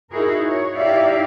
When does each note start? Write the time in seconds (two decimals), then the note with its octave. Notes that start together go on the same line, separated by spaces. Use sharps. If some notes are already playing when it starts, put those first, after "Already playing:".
0.11 D#4 E4 F#4 G#4 A#4
0.43 C#5
0.77 D#4 E4 G4 D5 E5 F5